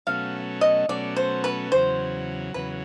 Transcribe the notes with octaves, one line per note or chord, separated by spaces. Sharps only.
B2 F#3 A3 C#4 F5
D#5
B2 F#3 A3 C#4 D5
C5
B4
E2 C#3 F#3 C5
E2 C#3 F#3 B4